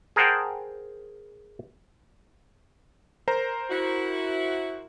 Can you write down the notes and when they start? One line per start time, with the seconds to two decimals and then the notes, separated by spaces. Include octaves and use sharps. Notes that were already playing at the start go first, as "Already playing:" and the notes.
0.16 G#4 A#4 C5 F#5 G5 A5
3.28 A#4 C5 A#5
3.70 E4 F#4